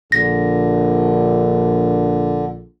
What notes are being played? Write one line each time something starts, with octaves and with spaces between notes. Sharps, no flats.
A#1 D3 A#6